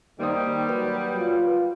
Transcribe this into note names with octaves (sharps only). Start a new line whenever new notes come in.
D#3 G3 A#3 C5 D#6
F#3 B4
F4